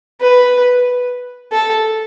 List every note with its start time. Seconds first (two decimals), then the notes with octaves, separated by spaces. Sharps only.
0.20 B4
1.52 A4